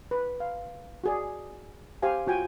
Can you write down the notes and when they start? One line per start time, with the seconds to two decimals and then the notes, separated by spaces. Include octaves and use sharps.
0.11 B4
0.40 F5
1.04 F#4 G#4 D5
2.02 G4 C5 F5 G#5
2.27 F4 F#4 G5 G#5